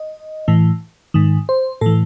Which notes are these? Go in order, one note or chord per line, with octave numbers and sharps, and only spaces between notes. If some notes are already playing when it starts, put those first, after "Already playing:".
Already playing: D#5
A2 E3
G#2 D#3
C5
A2 E3 A4